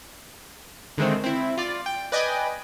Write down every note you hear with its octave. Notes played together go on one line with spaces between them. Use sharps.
D3 D#3 G#3 A3 C4
C4 E4
F4 D5
G5
B4 D5 D#5 G5 G#5